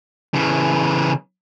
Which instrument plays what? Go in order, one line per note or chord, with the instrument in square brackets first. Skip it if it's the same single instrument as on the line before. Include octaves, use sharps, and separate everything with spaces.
[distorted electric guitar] C#3 E3